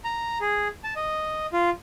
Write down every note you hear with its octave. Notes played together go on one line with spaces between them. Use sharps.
A#5
G#4
A5
D#5
F4